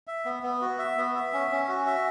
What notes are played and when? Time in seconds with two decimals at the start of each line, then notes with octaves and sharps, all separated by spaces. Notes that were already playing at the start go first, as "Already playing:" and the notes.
0.07 E5
0.25 B3
0.43 B3
0.61 F#4
0.79 E5
0.97 B3
1.16 E5
1.33 C#4
1.51 C#4
1.68 F#4
1.86 E5